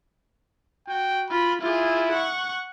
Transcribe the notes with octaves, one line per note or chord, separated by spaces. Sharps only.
F#4 G5
F4 B5
E4 F4 G#4
F#5 C#6